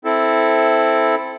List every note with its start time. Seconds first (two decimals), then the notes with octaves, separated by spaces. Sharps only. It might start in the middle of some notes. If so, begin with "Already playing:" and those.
0.05 C4 E4 A4